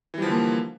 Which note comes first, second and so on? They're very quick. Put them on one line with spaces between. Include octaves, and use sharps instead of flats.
E3 G3 F3 D3 A#3